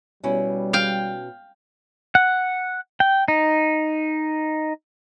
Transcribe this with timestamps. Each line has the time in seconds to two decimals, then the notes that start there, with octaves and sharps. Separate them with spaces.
0.24 B2 G3 C#4 E4
0.73 F5 G5
2.15 F#5
3.00 G5
3.28 D#4